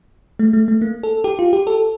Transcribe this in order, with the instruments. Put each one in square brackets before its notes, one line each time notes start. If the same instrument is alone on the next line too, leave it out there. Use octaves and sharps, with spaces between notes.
[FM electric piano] A3
A3
A3
A#3
A4
G4
F4
G4
A4